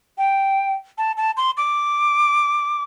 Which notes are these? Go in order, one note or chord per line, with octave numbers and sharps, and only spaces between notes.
G5
A5
A5
C6
D6